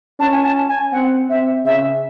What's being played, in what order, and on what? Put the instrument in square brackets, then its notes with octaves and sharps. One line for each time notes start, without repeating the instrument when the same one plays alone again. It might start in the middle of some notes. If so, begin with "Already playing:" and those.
[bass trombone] C#4 [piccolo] A5
[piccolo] G#5
A5
G#5
[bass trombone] C4 [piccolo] F#5
[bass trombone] C4 [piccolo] E5
[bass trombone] C#3 [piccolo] E5